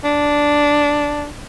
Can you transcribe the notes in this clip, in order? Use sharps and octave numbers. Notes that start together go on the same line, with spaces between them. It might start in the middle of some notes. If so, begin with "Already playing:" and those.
D4